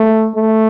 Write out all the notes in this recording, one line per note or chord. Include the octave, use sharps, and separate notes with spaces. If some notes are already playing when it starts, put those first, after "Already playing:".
Already playing: A3
A3